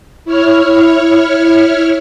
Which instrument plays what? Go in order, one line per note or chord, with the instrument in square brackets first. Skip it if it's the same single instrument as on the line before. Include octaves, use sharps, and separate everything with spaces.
[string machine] E4 C#5 F6